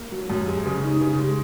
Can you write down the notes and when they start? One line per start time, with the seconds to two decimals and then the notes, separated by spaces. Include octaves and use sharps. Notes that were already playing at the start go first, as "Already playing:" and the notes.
Already playing: A#3
0.12 F#3
0.30 F#2
0.48 G#3
0.65 C#3
0.83 D#4
1.01 C#3
1.19 G#3